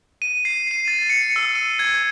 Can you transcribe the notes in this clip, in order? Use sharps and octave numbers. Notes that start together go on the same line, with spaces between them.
D#7
C7
D#7
A6
C#7
E6
D#7
G#6